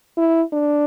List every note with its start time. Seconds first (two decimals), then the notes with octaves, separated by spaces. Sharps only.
0.17 E4
0.53 D4